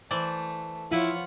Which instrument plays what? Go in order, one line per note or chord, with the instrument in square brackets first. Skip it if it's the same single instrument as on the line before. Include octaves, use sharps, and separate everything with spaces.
[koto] E3 C5 D5 [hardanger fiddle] A3
[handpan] F3 F4 [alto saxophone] E4 [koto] B4 [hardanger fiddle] C#5 F#5